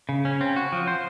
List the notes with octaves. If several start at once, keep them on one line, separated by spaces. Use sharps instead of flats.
C#3
C#4
C4
F#4
F3
C5